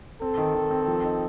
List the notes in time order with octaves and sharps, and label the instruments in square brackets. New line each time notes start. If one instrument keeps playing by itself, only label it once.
[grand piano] C4 [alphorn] A4
[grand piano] D#3
D#3
C4
F3
D#4